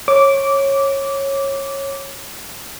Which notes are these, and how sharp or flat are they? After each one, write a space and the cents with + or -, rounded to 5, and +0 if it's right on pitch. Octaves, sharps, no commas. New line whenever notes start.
C#5 -15 D6 -15